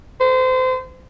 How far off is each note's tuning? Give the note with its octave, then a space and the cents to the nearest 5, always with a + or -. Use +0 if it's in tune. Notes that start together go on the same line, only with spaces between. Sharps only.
C5 -30